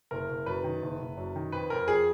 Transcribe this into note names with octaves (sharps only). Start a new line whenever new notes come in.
F#1 A#4
F#1
F#2 B4
D#3
F#1
F#1
F#2
D#3
F2 B4
F2 A#4
F3 G#4